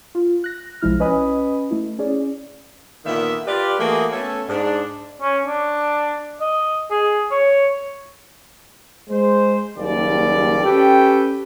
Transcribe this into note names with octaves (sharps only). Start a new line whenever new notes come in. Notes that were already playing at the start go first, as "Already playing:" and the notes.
F4
F#6 A#6
B1 F3 G#3 E4 F6
C#4 B4 D#5 G#5 B5 D#6
A3 E4
C#4 G#4 D5
A#2 D3 D#3 A#3 B3 E5
F4 G4 B4 D5
E3 A3 A#3 F#4 G#4
A3 B3 C#4 A4
G#2 D4
C#4
D4
D#5
G#4
C#5
G#3 C5
F#1 D#2 G3 D5
C#4 G4 A4 B4 G5